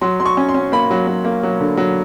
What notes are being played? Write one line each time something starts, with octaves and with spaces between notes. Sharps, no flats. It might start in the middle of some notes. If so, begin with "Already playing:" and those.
F#3 C6
F#3 C6
C#6
C#4
C6
C#4
A#3 B5
F#3
F#3
A#3
F#3
D3
F#3